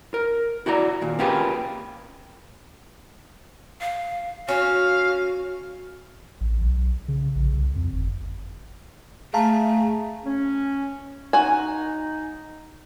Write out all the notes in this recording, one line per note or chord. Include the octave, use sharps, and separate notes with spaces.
A#4
E4 F#4 D5 A#5
D#2 A#2
A#3 C#4 F4 G4 G#4 B4
F5
C#4 F#4 F5
A1
B1
C#3
A#1
C2
F2
G1
A3 G#4 F5 A5 A#5
C#4
D#4 F#4 G#5